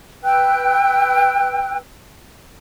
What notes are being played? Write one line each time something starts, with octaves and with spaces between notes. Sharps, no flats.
B4 G5 E6 F#6